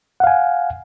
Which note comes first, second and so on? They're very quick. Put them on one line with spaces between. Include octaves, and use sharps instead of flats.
F#5 F5 G#5